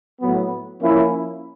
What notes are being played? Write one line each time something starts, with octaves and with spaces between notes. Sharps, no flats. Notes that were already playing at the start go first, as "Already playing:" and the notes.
A2 F#3 B3
F3 A#3 C#4 E4